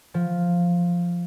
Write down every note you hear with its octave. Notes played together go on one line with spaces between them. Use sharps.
F3